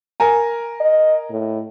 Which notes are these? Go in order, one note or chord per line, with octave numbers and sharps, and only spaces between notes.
A#4 G#5 A#5
D#5
A2